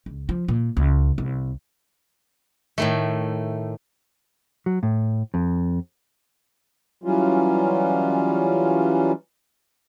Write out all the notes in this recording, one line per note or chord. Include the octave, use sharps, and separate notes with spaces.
C#2
F3
A#2
C#2
C2
A2 D#3 A3
F#3
A2
F2
E3 F#3 G3 C#4 F4